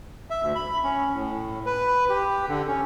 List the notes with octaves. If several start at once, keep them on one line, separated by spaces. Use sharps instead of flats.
E5
D2
B5
C#4
A2
B4
G4
D3
C#4